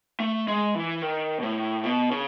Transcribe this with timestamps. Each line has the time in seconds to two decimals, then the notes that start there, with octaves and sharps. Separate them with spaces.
0.20 A3
0.48 G#3
0.75 E3
1.02 D#3
1.39 B2
1.43 A2
1.84 B2
2.11 C#3